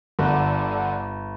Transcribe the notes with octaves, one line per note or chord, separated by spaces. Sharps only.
G1 D3